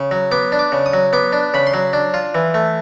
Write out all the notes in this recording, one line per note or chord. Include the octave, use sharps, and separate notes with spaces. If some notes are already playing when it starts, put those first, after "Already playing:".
Already playing: C#3
F#3
B3 D6
D4
D6
C#3
D#6
F#3
B3 D6
D4
C#3 B5
C6
F#3
D4
F4
E3
A3